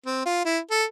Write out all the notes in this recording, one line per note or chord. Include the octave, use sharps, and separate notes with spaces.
C4
F4
E4
A4